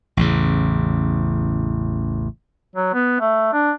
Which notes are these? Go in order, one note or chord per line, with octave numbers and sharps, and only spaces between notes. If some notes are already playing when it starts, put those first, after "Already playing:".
A1 E2 C#3
F#3
B3
A3
D4